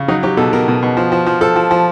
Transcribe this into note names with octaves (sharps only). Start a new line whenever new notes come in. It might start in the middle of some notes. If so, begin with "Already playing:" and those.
Already playing: C#3
F#3 D#4
F#3 G4
B2 A4
B2 A#4
B2
B2
F3
F3
F3
F3 A4
F3
F3